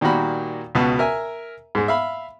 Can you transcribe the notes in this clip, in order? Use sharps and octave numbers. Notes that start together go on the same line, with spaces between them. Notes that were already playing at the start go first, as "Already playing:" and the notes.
A#2 D#3 G3 A#3 F#4 B5
C#2 B2 B3 F#4 A5
A#4 E5 G#5
G#2 G#3
E5 F5 B5